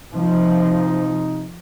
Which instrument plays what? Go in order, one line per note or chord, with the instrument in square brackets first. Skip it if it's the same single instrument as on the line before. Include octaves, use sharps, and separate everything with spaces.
[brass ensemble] C3 D#4 [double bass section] F3